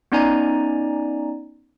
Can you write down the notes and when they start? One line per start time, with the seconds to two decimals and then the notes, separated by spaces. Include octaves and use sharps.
0.12 B3 C#4 D#4 D5 G#5 A#5